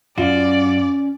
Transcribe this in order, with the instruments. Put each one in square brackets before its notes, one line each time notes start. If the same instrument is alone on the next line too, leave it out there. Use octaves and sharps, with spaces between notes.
[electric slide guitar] F#2 F#4 [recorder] C#4 [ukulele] F4 [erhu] D5